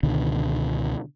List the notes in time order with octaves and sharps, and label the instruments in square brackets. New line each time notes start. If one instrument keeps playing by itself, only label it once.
[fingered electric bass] C#2 B2 D3 D#3